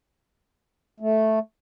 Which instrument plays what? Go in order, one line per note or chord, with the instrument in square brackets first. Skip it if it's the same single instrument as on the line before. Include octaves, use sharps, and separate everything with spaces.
[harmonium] A3